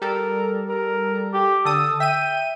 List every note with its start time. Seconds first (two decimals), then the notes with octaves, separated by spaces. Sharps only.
0.02 G3 A4 A#4
0.69 A#4
1.33 G4
1.65 D3 A4 D#6
2.00 E5 G5 D#7